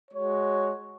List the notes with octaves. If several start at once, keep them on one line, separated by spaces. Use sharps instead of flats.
G#3 F#4 C#5